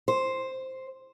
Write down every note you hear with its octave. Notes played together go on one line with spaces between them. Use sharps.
C5